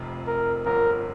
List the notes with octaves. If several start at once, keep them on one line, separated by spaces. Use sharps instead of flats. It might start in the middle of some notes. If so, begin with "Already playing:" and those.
Already playing: F1 F2 C3 F4
A#4
G1 F2 D3 A#4